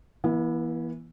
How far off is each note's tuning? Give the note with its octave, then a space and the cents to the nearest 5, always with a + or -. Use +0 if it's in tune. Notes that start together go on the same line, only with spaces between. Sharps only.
E3 +0 B3 -45 E4 +0